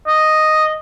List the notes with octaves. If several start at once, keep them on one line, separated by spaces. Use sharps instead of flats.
D#5